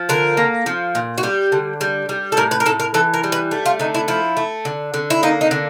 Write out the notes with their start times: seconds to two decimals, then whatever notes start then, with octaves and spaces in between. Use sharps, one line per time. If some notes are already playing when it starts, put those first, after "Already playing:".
Already playing: F3
0.09 D3 A#4
0.37 A#3
0.66 F3
0.95 A#2
1.18 F#4
1.23 G3 G4
1.52 D3
1.81 G3
2.09 G3
2.32 A4
2.37 A2 A#4
2.51 B4
2.60 A#4
2.66 A2 A4
2.80 A#4
2.94 E3 A4
3.14 A#4
3.24 G3
3.32 B4
3.51 A3
3.66 F4
3.80 D3 D#4
3.95 E4
4.08 F3 E4
4.37 A3
4.65 D3
4.94 D3
5.10 E4
5.23 A#3 D#4
5.41 D#4
5.51 D3